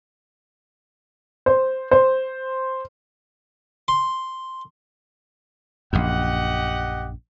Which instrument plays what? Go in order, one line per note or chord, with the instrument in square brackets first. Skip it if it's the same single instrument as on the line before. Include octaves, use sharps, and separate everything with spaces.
[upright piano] C5
C5
[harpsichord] C6
[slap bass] A#1 F#2 [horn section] G4 D#5 F#5